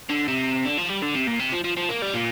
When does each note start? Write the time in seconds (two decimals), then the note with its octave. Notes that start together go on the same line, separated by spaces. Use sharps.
0.10 D3
0.28 C3
0.65 D3
0.78 F3
0.90 G3
1.02 D3
1.15 C3
1.27 A#2
1.40 C3
1.53 F3
1.64 F3
1.77 F3
1.89 A#3
2.02 G3
2.14 A#2